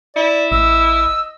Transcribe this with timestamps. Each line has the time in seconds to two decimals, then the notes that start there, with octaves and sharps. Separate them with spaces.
0.16 E4 D5
0.52 A1 D#5 E6